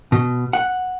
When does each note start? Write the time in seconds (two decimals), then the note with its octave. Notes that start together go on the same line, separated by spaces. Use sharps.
0.12 B2
0.53 F#5